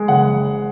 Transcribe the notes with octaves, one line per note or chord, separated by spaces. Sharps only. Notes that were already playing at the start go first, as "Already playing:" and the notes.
Already playing: G#3
F#1 F#5